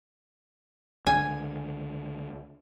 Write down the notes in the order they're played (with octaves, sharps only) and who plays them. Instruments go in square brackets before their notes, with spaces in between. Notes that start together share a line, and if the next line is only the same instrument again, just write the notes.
[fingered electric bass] C#2 D3 [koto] G#5